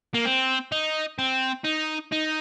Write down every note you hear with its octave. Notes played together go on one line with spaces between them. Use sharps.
A#3
C4
D#4
C4
D#4
D#4